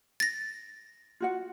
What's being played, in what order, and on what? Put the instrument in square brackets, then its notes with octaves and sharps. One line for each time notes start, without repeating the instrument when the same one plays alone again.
[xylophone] A6 A#6
[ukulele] F4 F#4 F#5